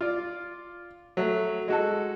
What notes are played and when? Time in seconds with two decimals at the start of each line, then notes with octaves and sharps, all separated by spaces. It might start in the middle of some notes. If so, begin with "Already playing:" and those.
0.01 F4 D5
1.17 F#3 A3
1.68 G#3 F#4 A4